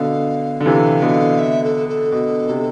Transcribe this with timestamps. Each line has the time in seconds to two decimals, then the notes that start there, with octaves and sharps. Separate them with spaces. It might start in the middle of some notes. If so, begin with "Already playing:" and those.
Already playing: B2 D3 F5
0.61 D3
0.65 C3 E3 F5
1.02 B2 D3
1.39 E5
1.63 A4
1.89 A4
2.12 B2
2.49 C3